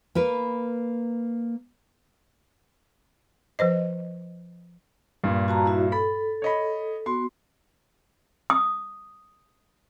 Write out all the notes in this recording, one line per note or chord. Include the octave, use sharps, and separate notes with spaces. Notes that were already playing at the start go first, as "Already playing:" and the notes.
A#3 A#4 B4
F3 B4 C5 D#5
G2 A#2
F#4 A5 A#5
E4 F#4 E5
A4 B5
C#5 D#5 B5
B3 F#4 C6
D#6